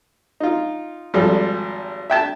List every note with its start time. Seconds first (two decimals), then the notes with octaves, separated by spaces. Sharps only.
0.40 D#4 F4
1.14 G#1 F3 G3 A4
2.10 E5 G5 A5